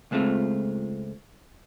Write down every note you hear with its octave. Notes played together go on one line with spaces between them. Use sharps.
C#2 G#3 A3 C4 F4